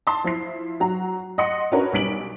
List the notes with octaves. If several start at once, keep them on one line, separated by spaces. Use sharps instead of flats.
A5 C6
F3 E4 C7
F#3 F#4 A#5
D#5 F#5 C6 C#7
C#4 D4 F#4 A#4 B4 C#5
B1 G3 B6 D7 F#7